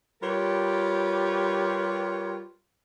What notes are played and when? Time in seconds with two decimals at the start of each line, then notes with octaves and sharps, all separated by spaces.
0.22 G3 F4 G4 A#4 B4 C#5